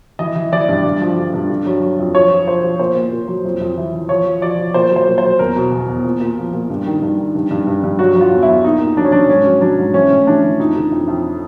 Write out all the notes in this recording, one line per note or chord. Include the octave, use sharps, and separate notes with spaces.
E3 D#5
E3
E3 D5
G2
G2
F3
D3
G2
D3
F#3
F#3
F2
F3 C#5
F3
F3 C5
F3
A#2 C5
A#2
A#2
F#3
F2
F2
E3
E3
F3 C#5
F3
F3 D5
F3
A#2 C5
F#3
C5
A#2
F#3 C5
E2 A#4
B2
E2
E2
A#2
A#2
F3
A#2
G2
D#3
G2
D#3
G2
G2
G2
G2
F#3 F#4
F#3
F4
E2
E4
E2
A#2 D#4
A#2
F#3 D4
C#4
F#3 D4
G#2 C#4
F#3
F#3 D4
G#2
E3 C#4
A2
E3 D4
E3
F2 D#4
D3
F2
F2